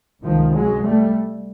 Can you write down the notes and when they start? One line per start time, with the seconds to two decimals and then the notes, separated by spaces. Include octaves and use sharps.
0.23 C#2 C3 D#3 F3
0.54 F#3 G#3
0.83 G3 A3